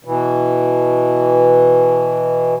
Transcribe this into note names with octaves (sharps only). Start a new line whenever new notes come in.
B2 E3